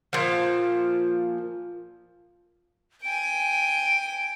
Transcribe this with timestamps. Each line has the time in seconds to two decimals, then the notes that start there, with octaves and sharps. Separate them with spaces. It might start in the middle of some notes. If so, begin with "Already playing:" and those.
0.13 A#2 F3
3.03 G5 G#5 D7